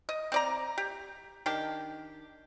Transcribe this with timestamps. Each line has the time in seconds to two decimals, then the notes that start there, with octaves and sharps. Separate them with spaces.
0.09 D#5
0.32 C4 D5 A#5
0.78 G4
1.46 D#3 D4 G4